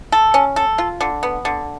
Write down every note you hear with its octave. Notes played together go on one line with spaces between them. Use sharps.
A4
C#4
A4
F4
D3
B3
D3